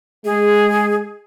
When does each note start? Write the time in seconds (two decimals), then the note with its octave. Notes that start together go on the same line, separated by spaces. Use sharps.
0.25 G#3 G#4